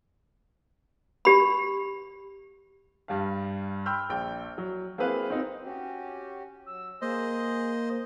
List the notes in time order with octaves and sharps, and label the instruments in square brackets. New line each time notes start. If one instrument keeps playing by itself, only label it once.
[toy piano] G4 B5
[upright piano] G2 G3 F5
G5 B5 C6 E6 F6 G6
A#1 G5
F#3
A#3 C4 E4 G#4 B4 F5
C4 D#4 F4
[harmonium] C#4 F#4 G4
[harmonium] F#3 [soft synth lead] E6
[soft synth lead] A#3 [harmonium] G#4 [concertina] C5 D#5